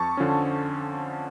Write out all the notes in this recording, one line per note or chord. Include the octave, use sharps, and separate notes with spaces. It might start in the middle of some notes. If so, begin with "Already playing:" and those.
Already playing: F2 A5 C#6
D3 F3 C#4